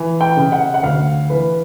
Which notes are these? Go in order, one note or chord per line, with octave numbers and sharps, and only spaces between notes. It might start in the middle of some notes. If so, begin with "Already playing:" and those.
Already playing: E3
G5
C#3
F#5
F#5
D2 F5
E3 B4